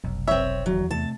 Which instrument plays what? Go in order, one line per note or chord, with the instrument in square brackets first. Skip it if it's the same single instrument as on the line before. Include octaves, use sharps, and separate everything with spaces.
[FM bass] F1 [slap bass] B1
[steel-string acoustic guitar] C4 C#5 [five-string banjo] E5
[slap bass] E2 D#3 [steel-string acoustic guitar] F#3
[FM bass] E2 [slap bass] C3 A3 [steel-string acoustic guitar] A5